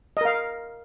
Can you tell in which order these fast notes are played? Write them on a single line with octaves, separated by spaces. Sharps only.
D#5 A#4 F5